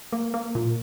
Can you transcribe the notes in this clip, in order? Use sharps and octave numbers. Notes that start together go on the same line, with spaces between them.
A#3
A#3
A#2